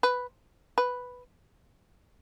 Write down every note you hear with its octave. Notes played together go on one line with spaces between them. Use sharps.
B4
B4